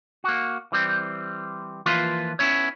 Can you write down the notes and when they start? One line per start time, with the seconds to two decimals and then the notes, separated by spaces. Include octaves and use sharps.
0.24 A#3 F#4
0.72 E3 G3 C4
1.86 E3 F3 A#3 F4 B4 C6
2.39 B3 C#4 E4 C#5